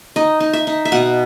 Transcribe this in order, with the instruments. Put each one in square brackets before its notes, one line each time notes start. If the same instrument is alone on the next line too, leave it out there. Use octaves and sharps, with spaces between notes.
[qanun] D#4 D#5
D#4
E5
D#4
E5
B2 F#5